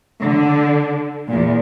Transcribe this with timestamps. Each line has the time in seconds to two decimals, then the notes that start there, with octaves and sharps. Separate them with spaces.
0.22 D3
1.28 E2 A#2